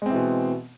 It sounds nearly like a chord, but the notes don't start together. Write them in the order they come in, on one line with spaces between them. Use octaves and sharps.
G#3 C4 E3 B2